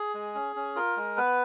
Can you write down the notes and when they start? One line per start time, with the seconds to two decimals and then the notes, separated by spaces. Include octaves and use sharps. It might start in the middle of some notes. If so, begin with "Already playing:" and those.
Already playing: G#4
0.14 G#3
0.35 C#4
0.56 C#4
0.76 F4 A#4
0.97 G#3
1.17 B3 B4